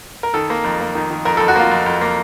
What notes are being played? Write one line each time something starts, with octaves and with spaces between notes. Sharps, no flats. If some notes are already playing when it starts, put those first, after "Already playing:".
A#4
D#3 A4
A#3
F2
A#3
D#3
D#3
F2 A#4
F2 A4
F#4
A#3 F4
F2
F2
A#3